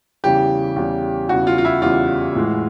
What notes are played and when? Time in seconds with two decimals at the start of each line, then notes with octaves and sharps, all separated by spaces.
0.24 E2 C#3 E3 G3 G4
0.76 E2 C#3 E3 G3
1.29 E2 C#3 E3 G3 F#4
1.47 F4
1.58 F4
1.65 E4
1.82 E2 C#3 E3 G3 F4
2.35 A2 E3 G#3